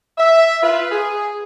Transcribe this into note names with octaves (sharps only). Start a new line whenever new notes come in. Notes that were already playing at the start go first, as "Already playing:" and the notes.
E5
F4 B4
G#4